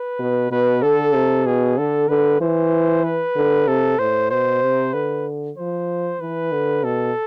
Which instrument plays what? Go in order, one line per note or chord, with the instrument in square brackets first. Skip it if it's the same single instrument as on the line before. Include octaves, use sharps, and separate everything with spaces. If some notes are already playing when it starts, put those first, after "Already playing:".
Already playing: [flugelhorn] B4
[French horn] B2
[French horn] B2 [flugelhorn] B4
[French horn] D3 [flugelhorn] A4
[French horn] C3
[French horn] B2 [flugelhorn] G#4
[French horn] D3 [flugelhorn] A4
[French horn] D3 [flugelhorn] B4
[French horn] E3 [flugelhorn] C5
[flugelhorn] B4
[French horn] D3
[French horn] C3 [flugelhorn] A4
[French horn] A2 [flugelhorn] C5
[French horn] B2 [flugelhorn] C5
[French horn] C3
[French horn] D3 [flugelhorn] B4
[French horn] F3 [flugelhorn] C5
[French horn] E3 [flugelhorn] B4
[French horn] D3
[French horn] B2 [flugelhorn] A4